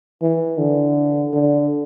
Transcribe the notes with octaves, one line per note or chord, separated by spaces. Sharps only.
E3
D3
D3